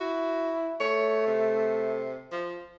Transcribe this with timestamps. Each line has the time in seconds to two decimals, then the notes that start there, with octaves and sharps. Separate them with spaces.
0.01 E4 F#4
0.80 A3 C#5
1.27 C3
2.32 F3